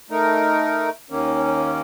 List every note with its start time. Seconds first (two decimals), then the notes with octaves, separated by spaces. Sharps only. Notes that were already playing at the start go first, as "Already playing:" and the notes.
0.10 A3 D#4 A#4
1.10 D#2 D#3 A#3 C#4